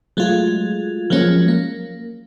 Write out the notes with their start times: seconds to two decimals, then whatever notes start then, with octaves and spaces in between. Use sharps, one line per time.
0.17 F#3 G#3 A3 F4
1.10 F3 F#3 G#3 A#3 C#4
1.48 A#3